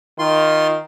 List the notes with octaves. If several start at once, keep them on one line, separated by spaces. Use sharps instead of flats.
D#3 F4 C6